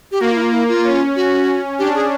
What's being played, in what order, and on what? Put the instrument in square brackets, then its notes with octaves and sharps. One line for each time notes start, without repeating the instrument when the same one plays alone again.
[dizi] G4
[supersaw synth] A#3 [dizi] F#4
[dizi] F4
E4
F4
E4
F4
[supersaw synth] C#4
[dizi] F#4
[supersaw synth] D4 [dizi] G4
[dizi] G#4